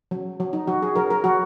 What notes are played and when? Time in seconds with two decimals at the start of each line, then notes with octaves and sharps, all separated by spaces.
0.11 F#3
0.40 F#3
0.53 D#4
0.67 F#3 F#4
0.82 G#4
0.96 F#3 A#4
1.10 A#4
1.24 F#3 F#4